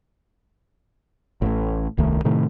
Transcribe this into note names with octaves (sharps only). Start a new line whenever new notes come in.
A1 A2
D#1 C2 D#3 A3
A2 C3 D#3 A3